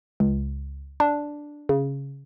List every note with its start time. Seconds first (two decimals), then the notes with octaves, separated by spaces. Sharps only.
0.20 C#2
1.00 D4
1.69 C#3